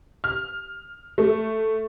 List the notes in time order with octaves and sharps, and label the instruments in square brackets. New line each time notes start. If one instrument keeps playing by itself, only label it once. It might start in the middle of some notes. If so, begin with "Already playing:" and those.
[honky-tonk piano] F6
A3